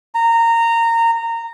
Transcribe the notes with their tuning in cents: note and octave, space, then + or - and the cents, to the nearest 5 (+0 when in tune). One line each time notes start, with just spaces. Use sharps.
A#5 -20